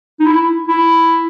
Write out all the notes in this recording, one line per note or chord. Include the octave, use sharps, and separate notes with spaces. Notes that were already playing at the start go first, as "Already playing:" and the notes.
D#4
E4
E4